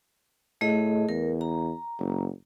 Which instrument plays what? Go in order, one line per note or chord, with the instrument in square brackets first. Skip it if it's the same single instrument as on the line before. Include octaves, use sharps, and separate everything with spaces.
[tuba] A2 [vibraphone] A3 G#4 D#5
[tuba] E2 [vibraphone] A#4
[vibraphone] A#5
[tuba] F#1